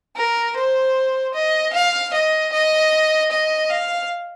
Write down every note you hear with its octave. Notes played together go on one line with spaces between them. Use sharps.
A#4
C5
D#5
F5
D#5
D#5
D#5
F5